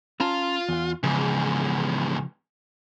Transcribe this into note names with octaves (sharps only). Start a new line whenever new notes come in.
C#4 F4 A5 A#5
E2 F#5
E2 G#2 C#3 F3